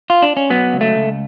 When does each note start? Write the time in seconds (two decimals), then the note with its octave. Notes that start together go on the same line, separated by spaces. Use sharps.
0.10 F4
0.22 D4
0.37 C#4
0.50 F#3 B3
0.73 C#2
0.81 A3
0.96 C#2